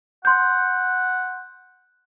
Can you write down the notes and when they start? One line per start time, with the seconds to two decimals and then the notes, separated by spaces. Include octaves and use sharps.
0.25 F#5 C6 G6